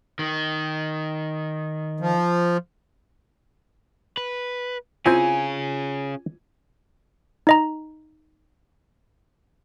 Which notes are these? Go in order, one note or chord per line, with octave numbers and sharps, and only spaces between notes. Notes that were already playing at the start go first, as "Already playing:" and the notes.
D#3
F3
B4
C4 C#4 E4 F4 G#4 G#5
D#4 D#5 A#5